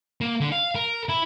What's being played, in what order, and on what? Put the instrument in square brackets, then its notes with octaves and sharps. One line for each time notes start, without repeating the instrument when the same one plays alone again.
[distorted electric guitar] A#3
D3
F5
A#4
E4